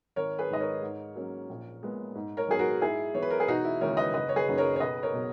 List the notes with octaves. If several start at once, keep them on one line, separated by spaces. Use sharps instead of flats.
G#1 A#4 C#5
G#4 B4
G#2 D#3 G#3 D#5
A#4 C#5
G#2
F#3 A#3 C#4
A#1
A#2 G#3 B3
G#2
A#4 C#5
D#3 F#3 B3 G#4
F#4 A#4
G#2 E4 G#4
E3 B3 C#5
B4
A#4
G#4
E1 D#4 F#4
E4
D#2 C#3 G#3 A#4 C#5
B4 D#5
F#1 B4 D#5
C#5
G#4 B4
F#2 D#3 A#3 C#4
A#4 C#5
C#5
B1 B4 D#5
A#4 C#5
B2 F#3 B3